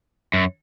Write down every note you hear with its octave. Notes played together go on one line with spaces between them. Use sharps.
F#2